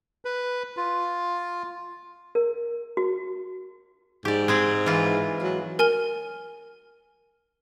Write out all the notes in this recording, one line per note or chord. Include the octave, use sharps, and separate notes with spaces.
B4
F4
A#4
F#4
G#2 G4 D5
G#3 C4 G#4
E3 F4
F#3
A#4 G#5 F6 G7